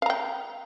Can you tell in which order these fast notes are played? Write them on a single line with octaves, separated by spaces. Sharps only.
F5 A#5 G5